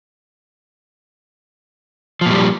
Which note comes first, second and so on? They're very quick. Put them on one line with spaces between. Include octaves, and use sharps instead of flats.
F3 A#2 G3